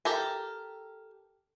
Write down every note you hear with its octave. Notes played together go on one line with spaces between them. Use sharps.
G4 A4 A#4